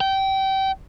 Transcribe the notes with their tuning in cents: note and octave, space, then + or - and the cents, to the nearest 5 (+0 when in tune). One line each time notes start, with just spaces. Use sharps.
G5 -25